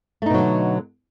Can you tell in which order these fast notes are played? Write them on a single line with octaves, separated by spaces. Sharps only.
A3 D#4 B2 F#3 D3